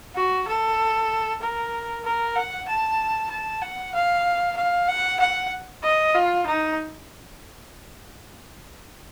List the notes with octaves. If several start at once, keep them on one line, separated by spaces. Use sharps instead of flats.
F#4
A4
A#4
A#4
F#5
A5
A5
F#5
F5
F5
F#5
F#5
D#5
F4
D#4